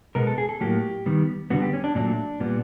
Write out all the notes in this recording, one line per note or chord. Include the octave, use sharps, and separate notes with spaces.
B2 G#3 B3 A#4
A4
G#4
A4
A2 F#3 A#3 G4
D#3 G3 B3
D3 G3 B3 F#4
G4
C#4
D4
A#2 F#3 A3 D4
A#2 G3 B3